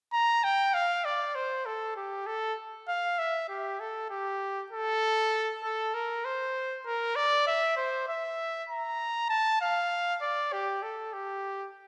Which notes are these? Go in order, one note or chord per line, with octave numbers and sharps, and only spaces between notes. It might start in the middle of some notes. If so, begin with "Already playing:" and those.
A#5
G5
F5
D5
C5
A4
G4
A4
F5
E5
G4
A4
G4
A4
A4
A#4
C5
A#4
D5
E5
C5
E5
A#5
A5
F5
D5
G4
A4
G4